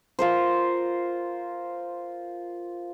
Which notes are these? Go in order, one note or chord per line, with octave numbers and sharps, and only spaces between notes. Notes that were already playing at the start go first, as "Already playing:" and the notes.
F4 A#4 C5